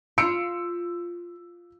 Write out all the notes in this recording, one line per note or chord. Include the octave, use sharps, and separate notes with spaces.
F4 E6 C#7 D7